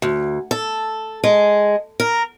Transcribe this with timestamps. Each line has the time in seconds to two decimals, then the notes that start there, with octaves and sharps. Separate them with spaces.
0.02 D2
0.51 A4
1.24 G#3
2.00 A#4